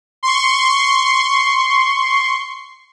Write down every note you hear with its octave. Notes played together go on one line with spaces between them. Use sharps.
C6 C#6